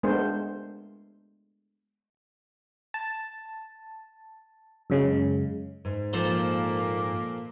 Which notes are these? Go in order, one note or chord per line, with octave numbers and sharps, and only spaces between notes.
G#3 A3 B3 D4 A#4 C5
A5
F#2 C#3 G#3
G#2
A#2 F3 A#3 A4 C5